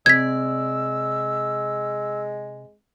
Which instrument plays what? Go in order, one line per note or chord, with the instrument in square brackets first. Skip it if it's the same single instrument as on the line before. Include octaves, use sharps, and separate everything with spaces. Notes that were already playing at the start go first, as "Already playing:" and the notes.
[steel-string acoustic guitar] C3 D5 [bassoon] G#3 [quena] E6 [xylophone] G#6 B6